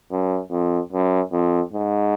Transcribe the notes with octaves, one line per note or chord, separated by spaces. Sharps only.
F#2
F2
F#2
F2
G#2